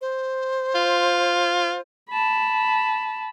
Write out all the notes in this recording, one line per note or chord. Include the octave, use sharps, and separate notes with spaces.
C5
F4
A5 B5